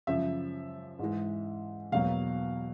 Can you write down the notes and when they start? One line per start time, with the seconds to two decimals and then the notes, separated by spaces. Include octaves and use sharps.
0.07 F#2 C#3 F3 E5
0.99 G#2 E3 G#3
1.92 E2 B2 F#3 A#3 F5